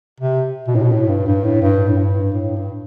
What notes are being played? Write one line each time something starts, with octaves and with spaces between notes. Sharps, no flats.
C3
B2
A2
B2
A2
G2
G2
A2
G2
A2
G2
A2
G2